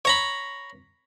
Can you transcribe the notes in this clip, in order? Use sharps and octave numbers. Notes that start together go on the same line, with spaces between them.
C#5 A#5 B5